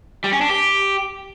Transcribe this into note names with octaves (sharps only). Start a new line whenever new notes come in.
G3
C#4
D4
G4